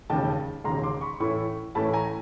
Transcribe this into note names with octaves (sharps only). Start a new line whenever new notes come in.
E1 D#2 C#3 G5 A5
E1 D#2 C#3 A#5 C6
C6 D6
B5 C#6
A2 E3 A3 C#4 E4 B5 C#6
A2 E3 A3 C#4 E4 A5 B5
G#5 A#5